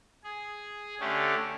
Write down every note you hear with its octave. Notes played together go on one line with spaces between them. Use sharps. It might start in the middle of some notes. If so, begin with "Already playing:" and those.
G#4
D3 A3 C#4 G4